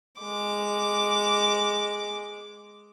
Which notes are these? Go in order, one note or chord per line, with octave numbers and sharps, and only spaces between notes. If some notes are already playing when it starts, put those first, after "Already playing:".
G#3 D6